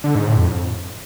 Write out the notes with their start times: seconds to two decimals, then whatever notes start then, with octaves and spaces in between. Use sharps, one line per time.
0.04 D3
0.15 G#2
0.27 A2
0.37 F2